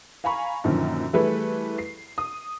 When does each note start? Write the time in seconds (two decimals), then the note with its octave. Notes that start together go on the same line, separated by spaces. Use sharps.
0.24 F5 G#5 A#5 B5 C#6
0.64 F#2 A#2 D3 D#3 F3
1.13 E3 G3 A3 G#4 B4
1.78 C7
2.18 D#6